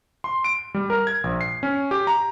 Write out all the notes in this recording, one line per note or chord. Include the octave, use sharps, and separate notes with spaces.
C6
D7
G3
A#4
G#6
A#1
C7
C#4
G4
A#5